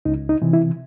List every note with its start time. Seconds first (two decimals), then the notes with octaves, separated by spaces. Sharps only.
0.05 C#2 D#4
0.29 D#4
0.42 C3 E3
0.53 E4